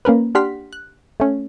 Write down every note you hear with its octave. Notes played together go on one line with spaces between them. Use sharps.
A#3 C#4 A#4 B4
D4 G4 F#5 C6 F6 B6
F#6
A3 C#4